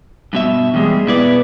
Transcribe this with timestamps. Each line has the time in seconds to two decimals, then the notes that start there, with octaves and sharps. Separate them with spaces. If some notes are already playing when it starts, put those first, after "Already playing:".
0.33 G2 B2 E5
0.74 E2 G3 G#3 G#4
1.07 B2 B3 E4 D5